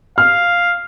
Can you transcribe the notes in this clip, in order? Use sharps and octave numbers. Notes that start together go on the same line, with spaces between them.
F5 F6